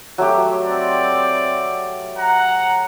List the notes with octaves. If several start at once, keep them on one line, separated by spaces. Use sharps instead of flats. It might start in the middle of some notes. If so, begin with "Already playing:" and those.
F#3 A3 G4
C4 D5
F#5 A#5